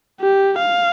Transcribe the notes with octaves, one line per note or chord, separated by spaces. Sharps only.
G4
F5